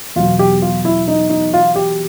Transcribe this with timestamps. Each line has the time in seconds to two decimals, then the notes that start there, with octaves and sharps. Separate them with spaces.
0.16 E2 B2 F#3 F4
0.39 G4
0.62 F4
0.85 E4
1.08 D#4
1.30 D#4
1.54 F4
1.76 G4